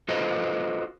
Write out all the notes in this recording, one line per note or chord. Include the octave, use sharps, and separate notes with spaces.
F4 F#4 A4 B4 C5 D#5